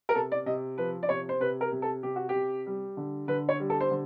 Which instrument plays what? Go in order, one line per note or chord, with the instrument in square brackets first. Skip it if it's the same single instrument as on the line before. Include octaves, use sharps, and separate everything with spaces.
[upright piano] A#4
C3 A4
D5
C3 D#5
F3 B4
D5
C3 C#5
C5
C3 B4
A#4
C3
A4
C3 G4
F#4
G4
C3
G3
D3
D3 B4
C#5
G3
A4
C5
D3